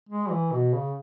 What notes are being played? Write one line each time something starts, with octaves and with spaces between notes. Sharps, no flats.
G#3
E3
B2
C#3